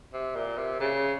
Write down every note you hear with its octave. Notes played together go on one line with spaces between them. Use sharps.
C3
A#2
C3
C#3